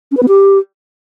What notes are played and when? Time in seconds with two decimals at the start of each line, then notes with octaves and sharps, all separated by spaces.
0.11 C#4
0.17 B4
0.23 B3
0.28 G4